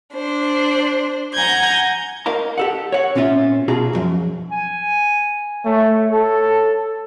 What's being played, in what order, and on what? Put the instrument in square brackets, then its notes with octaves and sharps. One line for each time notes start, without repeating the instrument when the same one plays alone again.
[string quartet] D4 C5
F#5 G#5 A#5 G6 G#6
[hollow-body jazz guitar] A#4 D#5 F5 A#5
G4 A4 F#5
C#5 F#5
A#2 C4 C#4 F4 E5
B2 F4 G#4 A5 A#5
C#2 F#2 F3
[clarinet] G#5
[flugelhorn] A3 [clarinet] C#5
[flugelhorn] A4